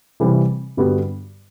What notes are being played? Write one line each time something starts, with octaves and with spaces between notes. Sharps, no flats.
C3 E3 G3 C4
G2 D3 G3 B3 F#4